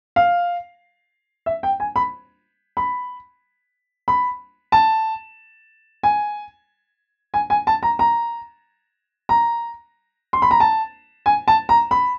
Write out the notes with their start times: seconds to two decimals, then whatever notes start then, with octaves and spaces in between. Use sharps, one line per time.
0.16 F5
1.46 E5
1.63 G5
1.80 G#5
1.96 B5
2.77 B5
4.08 B5
4.72 A5
6.03 G#5
7.34 G#5
7.50 G#5
7.67 A5
7.83 A#5
7.99 A#5
9.29 A#5
10.33 C6
10.42 B5
10.51 A#5
10.60 A5
11.26 G#5
11.48 A5
11.69 A#5
11.91 B5